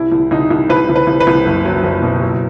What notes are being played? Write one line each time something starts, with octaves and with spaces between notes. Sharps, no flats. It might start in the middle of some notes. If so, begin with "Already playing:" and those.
Already playing: C2 E4
C2
C2 D#4
C2
C2 B4
C2
B4
C2
B4
C2
F#1
F#3
F#1
B2
F#3